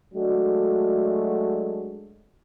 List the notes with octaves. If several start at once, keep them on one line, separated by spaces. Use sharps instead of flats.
F#3 G#3 A3 D4 F#4